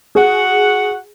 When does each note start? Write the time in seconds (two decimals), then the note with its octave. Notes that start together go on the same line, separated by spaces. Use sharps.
0.15 F#4 G#4 F#5